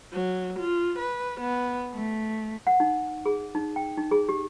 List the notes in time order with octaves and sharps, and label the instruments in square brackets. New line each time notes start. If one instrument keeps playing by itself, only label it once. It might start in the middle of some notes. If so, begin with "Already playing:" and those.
[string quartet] F#3
F4
B4
B3
A3
[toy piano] F#5
D#4
G#4
D#4
G5
D#4
G#4
G4